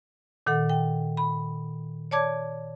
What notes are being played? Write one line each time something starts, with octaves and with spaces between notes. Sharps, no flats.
A#2 D#3 A4 F#5
G5
B5
C#5 D5 A5 D6 G#6